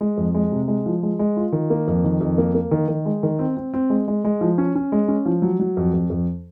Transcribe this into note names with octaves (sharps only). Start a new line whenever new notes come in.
G#3
F2
G#3
C3
G#3
F3
G#3
G#3
F4
D#3
A#3
F2
D#3
F2
A#3
A#3
D#3
D#3
G#3
D#3
C4
C4
C4
G#3
G#3
G#3
F3
C#4
C#4
G#3
C#4
F3
F#3
F#3
F2
F2
F2